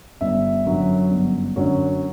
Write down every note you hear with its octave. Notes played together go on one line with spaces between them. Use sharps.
G1 E5
F#2 D3 F#3 C#4
G1
F#2 D3 F#3 C#4